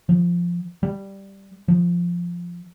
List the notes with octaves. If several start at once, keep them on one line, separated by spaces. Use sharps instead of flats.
F3
G3
F3